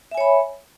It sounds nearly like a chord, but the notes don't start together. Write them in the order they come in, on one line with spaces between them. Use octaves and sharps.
E5 G#5 C#5 B5